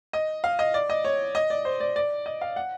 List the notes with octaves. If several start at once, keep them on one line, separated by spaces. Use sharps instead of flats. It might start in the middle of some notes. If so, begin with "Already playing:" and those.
D#5
F5
D#5
D5
D#5
C#5
D#5
D5
C5
D5
D5
D#5
F5
F#5